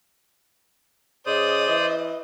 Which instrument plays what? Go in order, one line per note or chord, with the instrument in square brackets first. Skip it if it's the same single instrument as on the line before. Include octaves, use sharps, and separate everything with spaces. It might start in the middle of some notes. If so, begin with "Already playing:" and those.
[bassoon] C#3 [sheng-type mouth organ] C5 D5 D#6 [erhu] D#5
[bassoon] E3